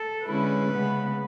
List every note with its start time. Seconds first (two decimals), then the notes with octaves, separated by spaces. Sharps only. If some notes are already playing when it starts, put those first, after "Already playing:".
Already playing: A4
0.26 D3 G#3 C#4 E4 B4
0.72 C#3 G#3 B3